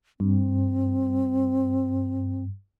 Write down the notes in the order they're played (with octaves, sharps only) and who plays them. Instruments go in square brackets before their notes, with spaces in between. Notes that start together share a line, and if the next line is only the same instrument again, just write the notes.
[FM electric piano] G2 [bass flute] C4